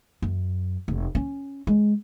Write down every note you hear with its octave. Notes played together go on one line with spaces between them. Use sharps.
F#2
F1
C#4
G#3